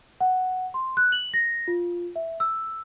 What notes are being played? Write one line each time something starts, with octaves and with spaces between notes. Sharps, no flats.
F#5
C6
F#6
F#7
A#6
F4
E5
E6